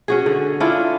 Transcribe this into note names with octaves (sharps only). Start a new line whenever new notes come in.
C#4 F#4 G#4
D3
C#4 D4 E4 F4